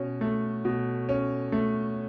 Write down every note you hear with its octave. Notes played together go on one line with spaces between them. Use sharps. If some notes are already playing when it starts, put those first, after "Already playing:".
Already playing: B2 C#4
A3
B2
C#4
A3